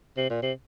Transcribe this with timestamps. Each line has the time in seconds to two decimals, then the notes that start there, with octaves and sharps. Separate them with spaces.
0.17 C3
0.30 A#2
0.42 C3